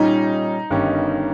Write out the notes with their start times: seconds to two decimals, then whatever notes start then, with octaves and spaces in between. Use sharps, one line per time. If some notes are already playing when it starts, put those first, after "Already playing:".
Already playing: A#2 G3 C#4 D#4
0.70 G1 G2 D#3 G3 C#4